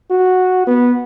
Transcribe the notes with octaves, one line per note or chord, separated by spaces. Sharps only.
F#4
B3